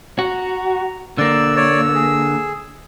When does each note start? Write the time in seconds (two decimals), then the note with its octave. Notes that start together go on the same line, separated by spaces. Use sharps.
0.19 F#4 A#5
1.18 D3 A#3 D5 E6
1.56 C#5 D5
1.95 G#4